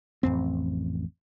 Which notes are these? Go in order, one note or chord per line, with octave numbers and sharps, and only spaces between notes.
A1 F2 C4